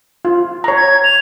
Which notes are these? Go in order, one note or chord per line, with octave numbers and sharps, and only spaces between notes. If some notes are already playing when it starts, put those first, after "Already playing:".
F4
C#5 A#5
G#6
F7